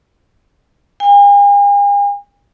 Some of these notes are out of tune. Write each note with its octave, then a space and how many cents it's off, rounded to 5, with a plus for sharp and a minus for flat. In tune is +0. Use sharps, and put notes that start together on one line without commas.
G#5 -45